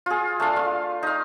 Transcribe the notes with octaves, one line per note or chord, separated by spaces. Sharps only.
F4 G#4
A3 D4 F5
F4
D#4 F5